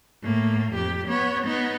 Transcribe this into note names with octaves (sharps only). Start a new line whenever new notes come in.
A2 A#3
F2 G4
B3 C#5
B3 D#4